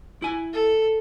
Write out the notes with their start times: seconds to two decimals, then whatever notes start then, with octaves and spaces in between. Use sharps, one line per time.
0.22 E4 G#5
0.53 A4